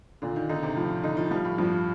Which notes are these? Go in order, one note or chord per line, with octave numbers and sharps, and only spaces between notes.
A#2 D3
D#3
D3 D#4
C3
A2 F3
D3 D#4
F3
F3 G3
A2
G2 F3